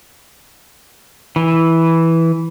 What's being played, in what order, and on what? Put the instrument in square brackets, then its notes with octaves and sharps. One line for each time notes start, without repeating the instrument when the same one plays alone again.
[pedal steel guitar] E3